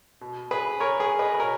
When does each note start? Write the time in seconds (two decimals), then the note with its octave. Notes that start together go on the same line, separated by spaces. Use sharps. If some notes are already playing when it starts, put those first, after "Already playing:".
0.21 B2
0.51 G#4 B4
0.80 A#4 C#5
1.00 G#4 B4
1.19 B4 D#5
1.34 B4
1.39 B2 A#4 C#5